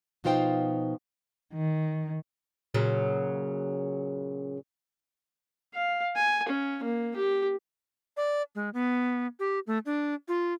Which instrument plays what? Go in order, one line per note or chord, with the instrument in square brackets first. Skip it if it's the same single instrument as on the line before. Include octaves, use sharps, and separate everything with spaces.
[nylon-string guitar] B2 F3 D#4 F4 C5 G5
[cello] D#3
[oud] A#2 C#3 F#3
[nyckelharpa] F5
G#5
C#4
A#3
G4
[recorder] D5
G#3
B3
G4
A3
D4
F4